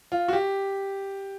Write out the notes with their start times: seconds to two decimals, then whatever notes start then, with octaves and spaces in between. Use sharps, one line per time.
0.12 F4
0.28 F#4
0.33 G4